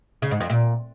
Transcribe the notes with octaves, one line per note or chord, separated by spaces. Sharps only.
C#3
G#2
F2
A#2